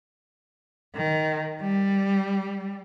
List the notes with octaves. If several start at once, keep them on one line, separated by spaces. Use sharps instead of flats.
D#3
G3